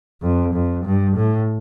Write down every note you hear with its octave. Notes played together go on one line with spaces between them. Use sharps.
F2
F2
G2
A2